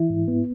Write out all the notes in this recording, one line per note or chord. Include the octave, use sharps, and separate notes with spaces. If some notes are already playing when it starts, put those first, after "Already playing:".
Already playing: E3 E4
G#2
B3